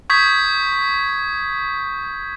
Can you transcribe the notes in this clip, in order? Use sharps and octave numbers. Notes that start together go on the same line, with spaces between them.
C#6 D#6 G6 G#6 B6